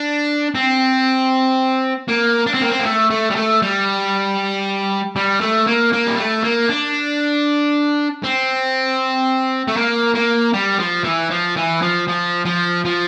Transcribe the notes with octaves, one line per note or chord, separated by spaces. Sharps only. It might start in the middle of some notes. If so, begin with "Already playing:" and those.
Already playing: D4
C4
A#3
D4
C4
A#3
C4
A#3
A3
A3
G3
A3
G3
G3
A3
A#3
A#3
G3
A3
A#3
D4
C4
A3
A#3
A#3
G3
F3
E3
F3
E3
F3
F3
F3
F3